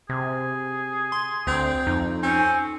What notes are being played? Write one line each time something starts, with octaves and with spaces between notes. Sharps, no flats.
C3 G#4
C6
D2 C4
F2 D#4
C4 C#4